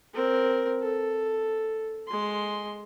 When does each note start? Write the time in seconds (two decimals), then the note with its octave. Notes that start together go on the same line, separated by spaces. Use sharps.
0.14 C4 A#4
0.82 A4
2.07 G#3 C6